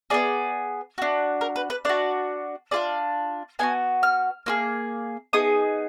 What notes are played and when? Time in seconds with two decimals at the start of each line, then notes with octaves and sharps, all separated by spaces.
0.10 B3 D4 G#4 D5
0.98 D4 F#4
1.41 A#4
1.56 B4
1.70 B4
1.85 D4 F#4 D5
2.71 D4 F4 G#4 D5
3.59 B3 D4 F#4 G#5
4.03 F6
4.46 A#3 F4 G#4
5.33 B3 D#4 G#4 D#6